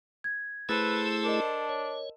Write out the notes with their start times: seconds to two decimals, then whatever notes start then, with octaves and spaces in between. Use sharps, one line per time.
0.24 G#6
0.69 A3 E4 G#4 A4 B4 C5 E6 A6
1.24 D4 A#4 D#5
1.69 C#5